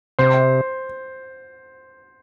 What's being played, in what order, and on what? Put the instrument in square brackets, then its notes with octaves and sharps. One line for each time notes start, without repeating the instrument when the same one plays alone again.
[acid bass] C3 [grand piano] C5